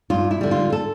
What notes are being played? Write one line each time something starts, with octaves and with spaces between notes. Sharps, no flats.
G2 F4
E4
D3 G3
F4
A4